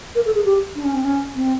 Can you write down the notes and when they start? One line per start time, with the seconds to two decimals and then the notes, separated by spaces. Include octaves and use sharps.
0.15 A#4
0.25 A4
0.35 G#4
0.44 G4
0.75 D4
0.84 C#4
0.94 C4
1.04 C#4
1.35 C4